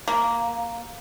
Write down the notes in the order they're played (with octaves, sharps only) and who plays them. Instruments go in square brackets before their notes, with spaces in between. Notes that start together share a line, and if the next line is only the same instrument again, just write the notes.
[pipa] A#3